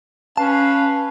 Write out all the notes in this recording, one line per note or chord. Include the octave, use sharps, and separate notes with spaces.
C#4 B4 F5 A5